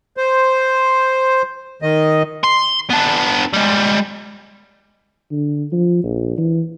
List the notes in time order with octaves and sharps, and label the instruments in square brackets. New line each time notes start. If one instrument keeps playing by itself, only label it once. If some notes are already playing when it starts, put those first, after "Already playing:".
[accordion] C5
D#3 D#5
[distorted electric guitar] C6
B3 D4
G3 G#3
[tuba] D3
F3
A#1
E3